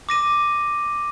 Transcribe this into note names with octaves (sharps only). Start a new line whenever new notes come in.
D6 A#6 D#7